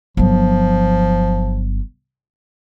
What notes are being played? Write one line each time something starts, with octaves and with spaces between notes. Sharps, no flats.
G1 F3 F#3